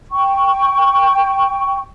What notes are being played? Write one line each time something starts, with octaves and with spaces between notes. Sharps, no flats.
G5 C#6